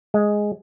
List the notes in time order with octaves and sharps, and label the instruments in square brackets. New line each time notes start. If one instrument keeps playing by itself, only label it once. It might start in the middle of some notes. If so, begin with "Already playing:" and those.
[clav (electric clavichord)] G#3